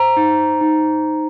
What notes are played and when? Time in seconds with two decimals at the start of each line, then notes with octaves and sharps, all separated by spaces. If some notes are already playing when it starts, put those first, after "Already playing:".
Already playing: C5 A#5
0.17 D#4
0.61 D#4